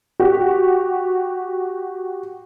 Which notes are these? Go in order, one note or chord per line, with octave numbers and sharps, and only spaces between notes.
F#4 G4